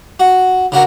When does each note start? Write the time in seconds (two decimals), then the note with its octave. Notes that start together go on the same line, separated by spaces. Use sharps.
0.20 F#4
0.72 C#3 D4 F#4 A#4